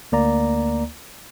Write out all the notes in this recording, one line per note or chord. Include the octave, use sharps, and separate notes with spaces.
D2 A#3 D5 A#5